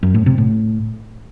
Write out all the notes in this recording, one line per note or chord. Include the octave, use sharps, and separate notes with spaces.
F#2
A2
C3
A2